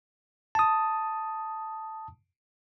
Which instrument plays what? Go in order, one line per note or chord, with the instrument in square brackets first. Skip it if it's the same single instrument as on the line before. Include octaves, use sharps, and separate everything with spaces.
[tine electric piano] A5 D#6